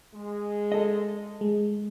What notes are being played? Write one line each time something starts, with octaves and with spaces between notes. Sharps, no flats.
G#3
A4 D#5
G#3